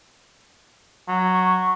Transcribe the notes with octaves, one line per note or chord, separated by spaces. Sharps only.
F#3
C#6